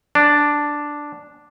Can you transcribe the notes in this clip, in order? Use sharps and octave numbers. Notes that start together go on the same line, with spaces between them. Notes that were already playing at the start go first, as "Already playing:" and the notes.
D4